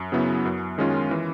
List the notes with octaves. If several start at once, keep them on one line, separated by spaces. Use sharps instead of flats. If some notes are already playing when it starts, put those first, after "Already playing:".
Already playing: F#2
C#3 F#3 B3 E4
F#2
D#3 G#3 C#4 F4
E3